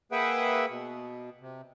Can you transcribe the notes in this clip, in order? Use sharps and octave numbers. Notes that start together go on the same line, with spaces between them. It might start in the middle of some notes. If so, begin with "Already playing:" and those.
A#3 G#4 B4 E5 F#5 G5
B2
C3